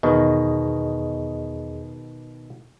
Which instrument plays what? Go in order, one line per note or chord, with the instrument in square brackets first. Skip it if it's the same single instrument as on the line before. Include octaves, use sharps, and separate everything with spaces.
[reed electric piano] E2 G#4 D#5 [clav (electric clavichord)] B2 D#3